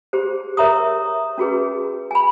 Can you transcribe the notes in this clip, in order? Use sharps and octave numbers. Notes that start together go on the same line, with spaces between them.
G4 G#4 C5
A#4 C#5 E5 A#5 C#6 D#6
C#4 F#4 G#4 B4
G#5 B5